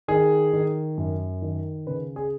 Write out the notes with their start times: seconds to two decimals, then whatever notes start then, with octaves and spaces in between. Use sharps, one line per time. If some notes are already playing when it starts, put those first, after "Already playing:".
0.08 D#3 G#4
0.53 D#3
0.97 F#2
1.42 D#3
1.87 C#3 B4
2.16 G#4